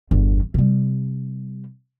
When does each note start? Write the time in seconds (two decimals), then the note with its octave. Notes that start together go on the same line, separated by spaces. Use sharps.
0.11 G1 E2
0.54 C3 G3